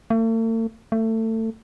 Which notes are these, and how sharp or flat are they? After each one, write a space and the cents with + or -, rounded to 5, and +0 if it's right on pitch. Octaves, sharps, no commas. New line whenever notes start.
A3 +45
A3 +25